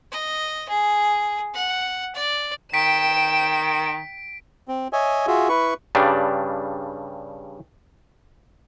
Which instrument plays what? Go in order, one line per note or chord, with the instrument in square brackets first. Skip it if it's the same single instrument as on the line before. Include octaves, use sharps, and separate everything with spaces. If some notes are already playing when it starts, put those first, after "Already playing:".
[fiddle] D#5
G#4
F#5
D5
[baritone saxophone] D#3 [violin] G5 E7 [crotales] B6 D7
[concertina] C4
C#5 D#5 E5 G#5
F4 F#4 G#4 E5
E4 B4 C#6
[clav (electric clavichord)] G2 C#3 G3 D4